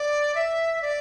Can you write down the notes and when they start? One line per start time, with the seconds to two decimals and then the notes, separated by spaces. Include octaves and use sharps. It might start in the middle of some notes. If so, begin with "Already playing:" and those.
Already playing: D5
0.35 E5
0.82 D5